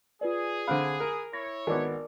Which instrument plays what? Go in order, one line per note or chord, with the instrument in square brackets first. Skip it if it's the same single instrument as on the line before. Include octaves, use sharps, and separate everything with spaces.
[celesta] F4 B4 D5 [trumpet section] G#4
[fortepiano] D3 C4 F5 [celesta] B5 F#6
[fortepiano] A#4
[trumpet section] E4 C#5 [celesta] A#6
[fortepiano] G#1 B3 [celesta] A#4 D5 D6